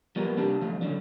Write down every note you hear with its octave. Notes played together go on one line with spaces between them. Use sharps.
F3 G3 A#3 B3 A#4
C3 G3 D4 G4 A5
D#2 F3 A3 F5
C#2 G2 D3 F#3 D4